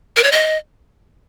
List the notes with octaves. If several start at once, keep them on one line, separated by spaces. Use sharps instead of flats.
A#4
C#5
D#5